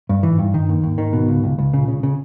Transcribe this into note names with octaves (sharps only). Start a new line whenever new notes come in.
G2
G#2 E3
G2
G2 D#3
D#2
D#2 G#2
D#3
B2
C#2
C#2
C#2
A#2 C#3
C#3
C#3